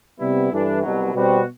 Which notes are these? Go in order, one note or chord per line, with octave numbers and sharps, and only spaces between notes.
C3 G3 B3 E4
G2 E3 A3 D4
C2 B2 F#3
B2 G3 C4 F#4